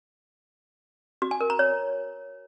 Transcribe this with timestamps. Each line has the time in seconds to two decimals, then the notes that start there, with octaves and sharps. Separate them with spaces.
1.22 F#4
1.31 G#5
1.41 A#4
1.50 A#5
1.59 C#5